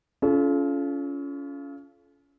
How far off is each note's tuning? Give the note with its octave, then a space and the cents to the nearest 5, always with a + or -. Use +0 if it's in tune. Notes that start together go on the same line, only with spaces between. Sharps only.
C#4 +25 F4 -20 A4 -35